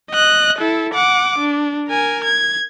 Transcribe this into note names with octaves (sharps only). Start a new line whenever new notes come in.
D#5 F#6
E4 A4
F#5 D6
D4
A#4 G#5
G#6